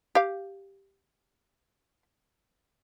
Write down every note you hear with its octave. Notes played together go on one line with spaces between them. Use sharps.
G4 F5